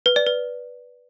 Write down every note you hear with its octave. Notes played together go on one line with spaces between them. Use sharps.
B4
D5
B4